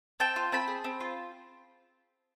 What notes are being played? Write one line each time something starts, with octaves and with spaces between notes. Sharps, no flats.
C4 G5 A5
F4
C4 A5 B5
G#4
C4
F4